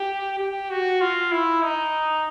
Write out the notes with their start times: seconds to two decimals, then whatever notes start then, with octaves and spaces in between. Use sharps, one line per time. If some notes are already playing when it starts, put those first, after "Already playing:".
Already playing: G4
0.39 G4
0.70 F#4
1.01 F4
1.32 E4
1.63 D#4